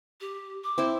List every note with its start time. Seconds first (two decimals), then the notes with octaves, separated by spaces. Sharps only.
0.21 G4
0.64 D6
0.78 C4 E4 C5